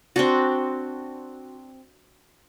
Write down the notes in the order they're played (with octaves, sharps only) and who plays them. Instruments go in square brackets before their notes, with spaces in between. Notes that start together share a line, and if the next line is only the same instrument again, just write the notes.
[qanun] C4 D4 F#4